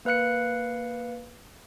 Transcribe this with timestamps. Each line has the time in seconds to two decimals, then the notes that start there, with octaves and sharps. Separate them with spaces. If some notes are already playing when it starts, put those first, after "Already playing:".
0.05 A#3 B4 F5 F#6 C#7